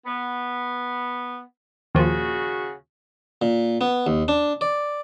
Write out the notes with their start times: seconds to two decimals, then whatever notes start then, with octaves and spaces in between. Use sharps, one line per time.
0.05 B3
1.95 D#2 A#2 C#3 F3 F#4
3.42 A#2
3.81 B3
4.07 D#2
4.28 D4
4.61 D5